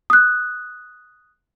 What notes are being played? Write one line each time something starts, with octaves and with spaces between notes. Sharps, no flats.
D#6 F#6